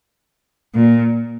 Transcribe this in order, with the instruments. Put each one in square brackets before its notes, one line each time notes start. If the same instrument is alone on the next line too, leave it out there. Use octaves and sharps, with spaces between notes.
[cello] A#2